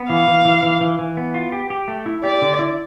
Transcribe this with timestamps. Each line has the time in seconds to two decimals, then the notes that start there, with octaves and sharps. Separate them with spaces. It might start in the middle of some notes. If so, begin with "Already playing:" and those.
Already playing: B3
0.09 E3 F5
0.27 E3
0.45 E3
0.63 E3
0.81 E3
0.99 E3
1.17 B3
1.34 F4
1.52 G4
1.70 G4
1.88 A3
2.06 E4
2.24 G4 D5
2.42 D3
2.59 E4